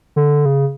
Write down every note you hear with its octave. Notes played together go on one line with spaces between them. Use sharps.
D3
C#3